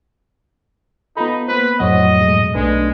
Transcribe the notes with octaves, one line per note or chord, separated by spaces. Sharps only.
B3 D#4 F4 A4 B5
A#3 B3 B4 C5
F2 A2 F#3 C5 C#5 D#5 F#5
G#2 B2 G#3
B1 G#3 A3 D4 B4